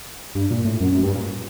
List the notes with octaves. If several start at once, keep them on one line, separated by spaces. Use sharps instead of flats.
G2
A#2
A2
F#2
F#2
G2
A#2